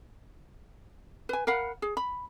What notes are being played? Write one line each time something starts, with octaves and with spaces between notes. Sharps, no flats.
B4 G#5
A#4 F5 F#5 B5
G#4
B5